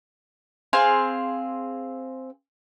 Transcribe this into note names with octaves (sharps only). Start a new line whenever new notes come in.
C4 G#4 F5